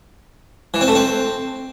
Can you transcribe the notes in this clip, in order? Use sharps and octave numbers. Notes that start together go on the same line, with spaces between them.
E3
C4
A3
C4